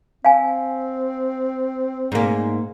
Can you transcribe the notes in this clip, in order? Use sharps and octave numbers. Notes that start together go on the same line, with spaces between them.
C4 F5 G#5
G#2 A#3